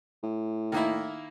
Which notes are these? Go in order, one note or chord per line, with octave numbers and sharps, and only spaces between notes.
A2
D#3 A#3 E4